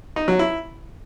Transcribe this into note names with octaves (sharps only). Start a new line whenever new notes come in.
D#4
F#3
E4